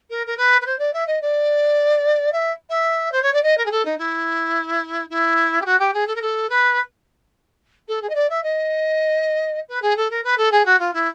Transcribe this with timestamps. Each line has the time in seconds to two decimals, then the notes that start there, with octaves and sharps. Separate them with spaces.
0.09 A#4
0.26 A#4
0.37 B4
0.61 B4
0.66 C5
0.78 D5
0.93 E5
1.06 D#5
1.21 D5
2.32 E5
2.69 E5
3.11 C5
3.22 C#5
3.33 D5
3.42 D#5
3.57 A#4
3.65 G#4
3.71 A4
3.85 D#4
3.98 E4
5.09 E4
5.61 G4
5.65 F#4
5.79 G4
5.93 G#4
6.07 A4
6.15 A#4
6.21 A4
6.49 B4
7.88 A4
8.01 G#4
8.09 D#5
8.15 D5
8.29 E5
8.43 D#5
9.68 B4
9.81 G#4
9.96 A4
10.10 A#4
10.23 B4
10.37 A4
10.51 G#4
10.65 F#4
10.79 F4
10.93 E4